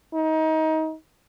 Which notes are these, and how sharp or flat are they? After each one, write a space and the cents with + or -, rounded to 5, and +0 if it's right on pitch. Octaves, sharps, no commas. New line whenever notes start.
D#4 +25